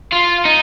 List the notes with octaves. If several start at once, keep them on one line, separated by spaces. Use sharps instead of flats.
F4
D#4